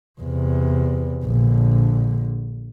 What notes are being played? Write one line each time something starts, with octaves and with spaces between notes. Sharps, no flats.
E2 C3
A#1 D3